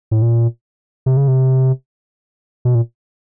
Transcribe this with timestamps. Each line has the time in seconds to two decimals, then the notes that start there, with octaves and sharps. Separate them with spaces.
0.11 A2
0.22 A#2
1.06 C3
1.17 C#3
1.28 C3
2.65 B2
2.75 A#2